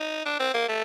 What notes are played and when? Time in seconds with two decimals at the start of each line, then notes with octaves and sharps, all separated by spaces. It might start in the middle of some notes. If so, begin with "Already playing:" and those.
Already playing: D#4
0.26 D4
0.39 C4
0.54 A#3
0.69 A3